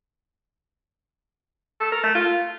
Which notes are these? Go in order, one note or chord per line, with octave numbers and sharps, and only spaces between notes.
A4
A#4
A3
F4